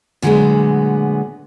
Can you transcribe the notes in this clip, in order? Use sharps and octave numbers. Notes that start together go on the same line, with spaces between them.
A#2 D3 F#3 G#3 A3 B3